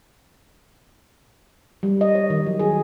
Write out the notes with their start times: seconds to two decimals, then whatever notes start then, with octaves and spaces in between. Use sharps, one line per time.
1.83 G3
2.01 D#5
2.15 C#5
2.30 D#3
2.47 F#3
2.59 G#4